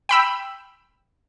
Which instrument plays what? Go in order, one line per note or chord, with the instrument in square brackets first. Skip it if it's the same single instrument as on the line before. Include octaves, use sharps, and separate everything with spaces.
[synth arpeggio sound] G5 B5 E6